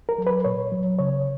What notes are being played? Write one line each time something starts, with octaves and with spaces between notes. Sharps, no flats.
A#4
F#3
B4
A#2 C#5
F#3
C#3 C#5